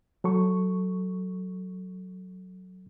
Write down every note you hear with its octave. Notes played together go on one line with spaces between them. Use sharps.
F#3 A4 C#6